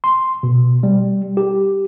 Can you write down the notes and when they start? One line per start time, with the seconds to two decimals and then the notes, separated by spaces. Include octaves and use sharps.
0.04 C6
0.43 B2
0.83 G3
1.37 G4